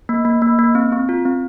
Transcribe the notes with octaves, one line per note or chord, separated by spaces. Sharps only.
A#3
A#3
A#3
A#3
C4
C4
F4
C4